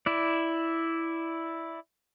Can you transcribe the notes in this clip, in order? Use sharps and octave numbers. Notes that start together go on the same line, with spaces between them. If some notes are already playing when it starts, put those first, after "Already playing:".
E4 D5